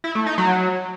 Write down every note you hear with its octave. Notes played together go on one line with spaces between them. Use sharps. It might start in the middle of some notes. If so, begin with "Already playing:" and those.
E4
A3
D#4
F#3